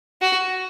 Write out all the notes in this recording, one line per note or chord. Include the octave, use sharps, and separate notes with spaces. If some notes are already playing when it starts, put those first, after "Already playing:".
F#4